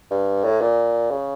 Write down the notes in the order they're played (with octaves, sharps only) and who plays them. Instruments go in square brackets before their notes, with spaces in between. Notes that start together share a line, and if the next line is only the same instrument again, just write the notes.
[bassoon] G2
A2
A#2
C#3